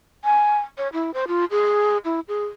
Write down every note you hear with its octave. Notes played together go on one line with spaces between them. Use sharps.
G#5
C#5
E4
C5
F4
G#4
E4
G#4